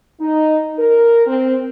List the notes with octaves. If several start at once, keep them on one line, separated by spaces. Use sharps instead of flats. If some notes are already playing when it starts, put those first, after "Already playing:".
D#4
A#4
C4